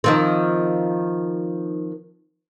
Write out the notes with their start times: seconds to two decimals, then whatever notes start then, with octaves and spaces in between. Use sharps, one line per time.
0.04 D#3 F3 C4